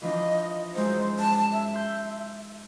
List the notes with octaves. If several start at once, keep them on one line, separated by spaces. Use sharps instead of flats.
E3 F3 D4 D#5
F#2 G#3 D#4 C5
A5
E5
C6 G6